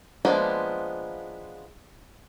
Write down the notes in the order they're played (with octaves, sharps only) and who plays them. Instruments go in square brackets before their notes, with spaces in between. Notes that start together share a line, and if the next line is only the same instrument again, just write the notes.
[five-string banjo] F3 G#3 A#3 B3 D4